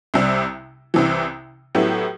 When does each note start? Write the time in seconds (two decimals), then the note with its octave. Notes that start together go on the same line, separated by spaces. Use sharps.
0.14 C2 C3 G3
0.94 C2 C3 E3
1.75 A2 F#3 B3 E4 G4